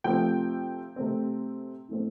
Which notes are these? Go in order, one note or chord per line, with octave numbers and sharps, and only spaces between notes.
C3 F3 A3 C4 G5
C3 A3 C4
A2 A3 C4